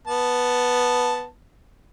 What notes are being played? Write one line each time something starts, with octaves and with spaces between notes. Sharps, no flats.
B3 A5